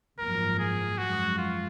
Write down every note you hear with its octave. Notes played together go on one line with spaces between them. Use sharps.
G#1 F#2 F3 A#3 A#4
G#4
F#2 F3 G#3 F#4
F4